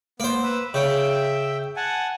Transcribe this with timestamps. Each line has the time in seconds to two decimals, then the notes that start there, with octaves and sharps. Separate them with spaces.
0.20 A#3 B3 C5
0.43 B4 E6
0.74 C#3 E5 G5
1.76 F#5 G#5 A5